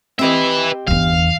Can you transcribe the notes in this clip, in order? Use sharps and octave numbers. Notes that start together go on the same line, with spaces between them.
C4 G4 B4 D#5 E5
G1 E2 F5